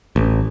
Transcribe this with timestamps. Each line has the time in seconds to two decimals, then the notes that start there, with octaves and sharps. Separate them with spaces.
0.16 A1